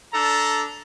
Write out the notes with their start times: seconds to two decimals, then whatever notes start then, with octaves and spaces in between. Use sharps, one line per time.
0.14 D4 A4 A#5